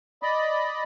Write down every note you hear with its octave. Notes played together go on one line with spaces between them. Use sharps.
D5 D#5 B5